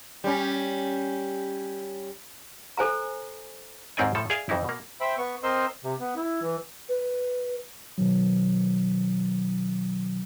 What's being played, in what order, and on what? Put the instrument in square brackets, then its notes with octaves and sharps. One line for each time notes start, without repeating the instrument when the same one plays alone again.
[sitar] G3 C#4
[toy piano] A4 C5 G#5 A#5
[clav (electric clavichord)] D#2 G#2 C4 C#4 D5 G#5
A2 F3 A4
G#4 D5 E5 F5 G#5
F2 E3 D#4 E4
B2 A#3
[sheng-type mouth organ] C5 E5 G5 B5
B3 C#6
C4 A#4 C5 D#5 C6 E6
[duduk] C3
B3
E4
E3
[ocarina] B4
[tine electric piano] B2 D#3 F#3